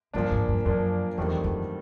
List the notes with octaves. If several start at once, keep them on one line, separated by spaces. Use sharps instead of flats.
G2 A#2 F3 A#3 D4
G#2
G2
F#2 A#2 F3 A#3 D4
E2 G2 D#3 F#3 A3 C4
F2